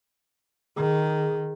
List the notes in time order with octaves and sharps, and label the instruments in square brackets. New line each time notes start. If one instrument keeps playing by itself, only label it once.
[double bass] D#3 [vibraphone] G#4